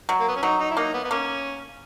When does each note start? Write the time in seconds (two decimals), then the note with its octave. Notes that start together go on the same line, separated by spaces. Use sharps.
0.09 F#3
0.20 A#3
0.28 B3
0.36 C#4
0.43 F#3 D#4
0.60 D#4
0.71 E4
0.77 A#3 D#4
0.94 B3
1.04 B3
1.11 A#3 C#4